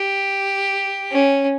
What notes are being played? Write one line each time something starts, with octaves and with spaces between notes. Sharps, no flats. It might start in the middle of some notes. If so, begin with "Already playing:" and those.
Already playing: G4
C#4